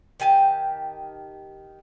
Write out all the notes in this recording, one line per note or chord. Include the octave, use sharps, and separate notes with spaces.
D#3 G4 G#5 A5